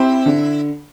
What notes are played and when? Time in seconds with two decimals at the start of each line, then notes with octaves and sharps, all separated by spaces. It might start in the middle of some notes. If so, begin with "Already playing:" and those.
Already playing: C4 E4 G4 C5
0.26 D3